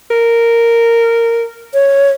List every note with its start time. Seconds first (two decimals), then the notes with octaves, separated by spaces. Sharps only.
0.11 A#4
1.74 C#5